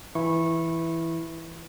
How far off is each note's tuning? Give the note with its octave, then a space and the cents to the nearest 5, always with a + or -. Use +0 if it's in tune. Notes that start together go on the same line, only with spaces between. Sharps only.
E3 +0 E4 +0 C#6 -20